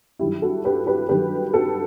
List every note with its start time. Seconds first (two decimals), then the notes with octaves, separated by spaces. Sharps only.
0.19 G2 D#3 F#3 E4 G4
0.42 F#4 A4
0.65 G4 B4
0.87 G4 B4
1.09 G2 D#3 F#3 G4 B4
1.54 F#4 A4